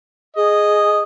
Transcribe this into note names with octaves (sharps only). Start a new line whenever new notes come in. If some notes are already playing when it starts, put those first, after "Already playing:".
G#4 D#5